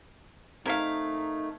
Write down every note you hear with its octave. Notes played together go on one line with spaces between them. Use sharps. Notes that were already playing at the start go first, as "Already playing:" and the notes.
A3 C4 D#4 A#4 F5 G#6 B6